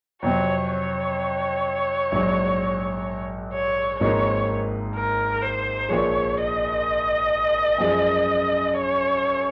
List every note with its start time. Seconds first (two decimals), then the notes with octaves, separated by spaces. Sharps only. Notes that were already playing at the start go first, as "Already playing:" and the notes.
0.22 F2 C3 F#3 C4 C#5
0.70 C#5
2.12 A#1 G#2 F#3
3.53 C#5
4.00 G#1 G#2 F3 A#3 D#4 C#5
4.95 A#4
5.42 C5
5.89 A#1 A#2 F3 G#3 C#5
6.37 D#5
7.78 F#2 F3 G#3
8.73 C#5